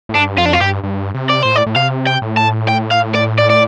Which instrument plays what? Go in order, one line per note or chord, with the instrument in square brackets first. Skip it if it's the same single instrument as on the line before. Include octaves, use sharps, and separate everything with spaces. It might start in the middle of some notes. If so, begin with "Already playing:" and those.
[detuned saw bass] A2
[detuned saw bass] G2 [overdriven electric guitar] D4
[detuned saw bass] F2 [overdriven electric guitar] F4
[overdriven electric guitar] D4
F4
[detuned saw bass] G2 [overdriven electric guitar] G4
[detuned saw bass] G2
C3
[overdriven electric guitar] D5
[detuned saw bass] A2 [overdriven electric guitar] C5
[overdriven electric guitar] D5
[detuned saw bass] A2
[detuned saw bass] C3 [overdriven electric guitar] F5
[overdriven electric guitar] G5
[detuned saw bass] A2
[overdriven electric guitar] A5
G5
F5
D5
D5
D5